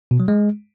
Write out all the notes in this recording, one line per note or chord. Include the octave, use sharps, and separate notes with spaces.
B2
F#3
G#3